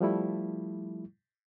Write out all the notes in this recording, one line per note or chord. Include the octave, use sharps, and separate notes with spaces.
F3 G3 A3 E4